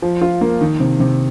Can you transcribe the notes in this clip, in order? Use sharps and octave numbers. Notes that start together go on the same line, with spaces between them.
F3
F4
A#3
D#3
C3
C3